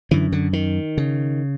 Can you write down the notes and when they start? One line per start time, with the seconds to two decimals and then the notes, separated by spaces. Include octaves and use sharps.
0.11 F#2 D3 E3
0.32 D3
0.53 D#3
0.97 C#3